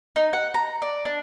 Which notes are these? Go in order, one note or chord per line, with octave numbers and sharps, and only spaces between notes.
D#4
F#5
A#5
D5
D4